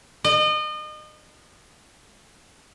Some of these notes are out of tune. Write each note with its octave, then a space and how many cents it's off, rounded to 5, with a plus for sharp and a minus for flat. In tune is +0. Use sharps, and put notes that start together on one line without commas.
D#5 -35